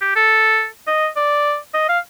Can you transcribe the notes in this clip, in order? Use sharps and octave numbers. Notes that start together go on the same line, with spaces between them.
G4
A4
D#5
D5
D#5
F5